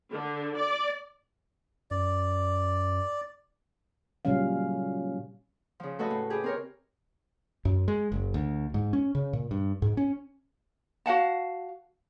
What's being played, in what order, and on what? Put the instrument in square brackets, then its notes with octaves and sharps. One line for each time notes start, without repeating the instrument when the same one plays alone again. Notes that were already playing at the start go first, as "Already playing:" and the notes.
[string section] D3
D5
[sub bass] F#2 [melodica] D5
[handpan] A#2 C#3 F#3 G3 C#4 F5
[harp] C#3 F3
A3 F#4 A4 B4 D#5
A2
G4 G#4 B4
C4 A#4 C#5
[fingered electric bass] F#2
G#3
F#1
D2
G#2
C#4
C#3
A#2
G2
G#2
C#4
[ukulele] F#4 F5 F#5 A5